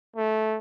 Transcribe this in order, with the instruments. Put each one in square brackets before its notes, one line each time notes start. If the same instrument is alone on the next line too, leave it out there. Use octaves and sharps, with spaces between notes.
[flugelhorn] A3